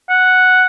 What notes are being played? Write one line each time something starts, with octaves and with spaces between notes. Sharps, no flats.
F#5